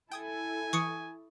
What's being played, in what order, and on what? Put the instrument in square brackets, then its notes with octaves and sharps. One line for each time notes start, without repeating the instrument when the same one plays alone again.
[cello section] E4 A4 [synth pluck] G5 D#6 G#6 [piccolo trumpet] G#5
[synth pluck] E3 [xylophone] C#6 D#6 C#7